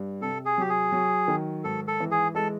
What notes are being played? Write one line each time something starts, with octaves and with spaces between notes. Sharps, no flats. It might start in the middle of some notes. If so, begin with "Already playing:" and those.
Already playing: G2
C3 A4
G#4
F#3 G4
G#4
F#3
D#3
G#2 A4
A4
E3
G#4
G#3 A4